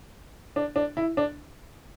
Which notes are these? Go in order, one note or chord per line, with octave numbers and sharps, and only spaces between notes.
D4
D4
E4
D4